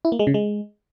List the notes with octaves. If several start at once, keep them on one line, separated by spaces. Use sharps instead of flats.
E4
A#3
G#3
C#3
G#3